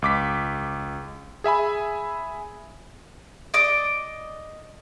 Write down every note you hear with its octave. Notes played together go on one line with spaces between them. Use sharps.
C#2 D6 B6
G#4 E5 G#5 B5
D5 D#5 D6